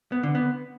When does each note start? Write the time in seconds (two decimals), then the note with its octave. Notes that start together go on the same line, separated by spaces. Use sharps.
0.12 B3
0.23 D3
0.35 B3